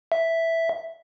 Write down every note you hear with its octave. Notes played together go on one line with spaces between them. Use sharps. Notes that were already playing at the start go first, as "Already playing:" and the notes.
E5